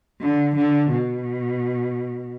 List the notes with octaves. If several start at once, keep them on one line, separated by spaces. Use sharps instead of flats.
D3
D3
B2